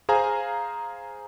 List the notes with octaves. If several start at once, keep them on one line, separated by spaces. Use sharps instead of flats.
G#4 C5 F5 G#5 A#5